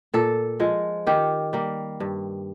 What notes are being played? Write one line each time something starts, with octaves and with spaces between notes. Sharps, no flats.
A#2 A4
F3 G#3
D#3 G4
G3 A#3
G2